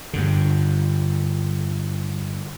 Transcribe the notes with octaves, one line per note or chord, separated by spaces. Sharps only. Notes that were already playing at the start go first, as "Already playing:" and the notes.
G2 D3